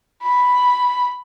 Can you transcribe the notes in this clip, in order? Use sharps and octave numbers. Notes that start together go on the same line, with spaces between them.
B5